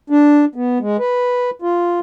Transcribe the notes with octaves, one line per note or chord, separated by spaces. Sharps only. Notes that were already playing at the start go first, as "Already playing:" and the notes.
D4
B3
G#3
B4
F4